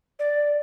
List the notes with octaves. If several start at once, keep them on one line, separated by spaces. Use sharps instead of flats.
D5